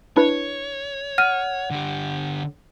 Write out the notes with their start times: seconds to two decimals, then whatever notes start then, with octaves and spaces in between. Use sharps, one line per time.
0.17 D4 E4 B4 C#5
1.18 F#5 F6 D#7
1.71 D3 G4